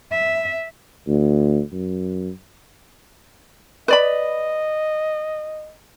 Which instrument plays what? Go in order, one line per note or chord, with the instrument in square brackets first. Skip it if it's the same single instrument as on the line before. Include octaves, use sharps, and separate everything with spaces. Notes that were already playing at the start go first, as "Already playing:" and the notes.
[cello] E5
[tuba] D2
F#2
[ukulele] B4 D5 B5 [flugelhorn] D#5